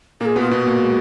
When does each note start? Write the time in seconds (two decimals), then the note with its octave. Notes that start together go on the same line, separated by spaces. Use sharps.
0.20 A#2 A#3 G#4 A#4
0.36 B2 B3 F4
0.51 B2 B3 F#4
0.66 A#2 A#3
0.82 G#3